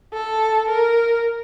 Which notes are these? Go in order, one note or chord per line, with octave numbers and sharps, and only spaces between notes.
A4
A#4